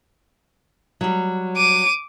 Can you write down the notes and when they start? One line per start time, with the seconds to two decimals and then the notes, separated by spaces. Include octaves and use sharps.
1.01 F#3 G3
1.57 D6 D#7